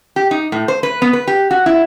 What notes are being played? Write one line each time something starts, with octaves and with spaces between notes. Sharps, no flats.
G4
D#4
A2
C5
B4
B3
B4
G4
F#4
E4